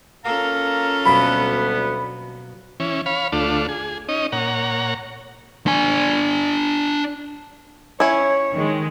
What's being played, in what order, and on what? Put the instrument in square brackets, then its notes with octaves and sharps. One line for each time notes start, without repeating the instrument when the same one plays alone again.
[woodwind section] A#3 F5 A#5 [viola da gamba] C#4 F4 A4
[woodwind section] D2 G3 B3 [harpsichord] B2 F#3 A#3 [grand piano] B5
[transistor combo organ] E3 C#4
C#5 F5 B5
D2 A3 D4 F4
G#4
C#4 D#4 D#5
A#2 C#5 F#5 A#5
[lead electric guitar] D4 G#5
[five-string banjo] C#4 E4 [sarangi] C#5
[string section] D#3 G#3